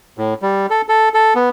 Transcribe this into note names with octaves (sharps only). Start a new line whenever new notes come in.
A2
G3
A4
A4
A4
B3